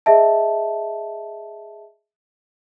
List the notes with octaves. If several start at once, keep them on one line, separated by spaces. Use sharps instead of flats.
G#4 D#5 E5 A5